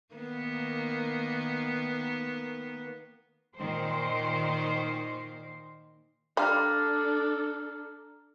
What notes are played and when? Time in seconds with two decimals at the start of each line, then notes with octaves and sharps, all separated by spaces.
0.14 D#3 A#3 B3
3.57 A#2 D#3 C5
6.37 G3 D4 F4 A4 A#5 F6